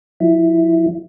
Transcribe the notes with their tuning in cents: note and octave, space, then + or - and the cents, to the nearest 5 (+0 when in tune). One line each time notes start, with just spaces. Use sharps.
F3 +35 E4 +0